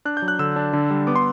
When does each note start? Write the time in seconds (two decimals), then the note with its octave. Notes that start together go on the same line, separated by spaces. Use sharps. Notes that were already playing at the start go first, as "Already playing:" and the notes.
0.05 D4 F#6
0.17 G6
0.22 F#3
0.28 F#6
0.39 D3 E6
0.56 D4
0.73 D3
0.90 G3
1.07 B3 D6
1.16 C6